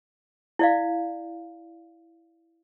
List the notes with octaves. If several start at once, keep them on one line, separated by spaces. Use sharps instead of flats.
E4 D5 F5